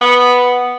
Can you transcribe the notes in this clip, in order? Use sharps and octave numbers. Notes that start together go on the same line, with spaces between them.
B3